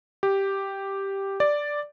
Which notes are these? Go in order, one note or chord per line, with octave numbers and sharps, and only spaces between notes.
G4
D5